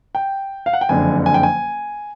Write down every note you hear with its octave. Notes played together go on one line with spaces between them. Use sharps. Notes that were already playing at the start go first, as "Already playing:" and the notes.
G5
F5
F#5
G5
F#1 F2 D3 G#5
G#5
G5
G#5